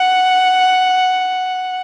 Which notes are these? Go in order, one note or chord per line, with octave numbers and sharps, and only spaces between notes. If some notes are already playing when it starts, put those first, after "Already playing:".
Already playing: F#5